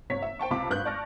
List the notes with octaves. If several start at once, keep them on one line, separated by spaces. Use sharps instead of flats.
G1 C3 C#5 B6
E5
C5 G5 A5 C#6
C#2 C3 A5 B5 D6
G#1 G2 B4 F#6 G6
D5 A5 C#6 F6 A#6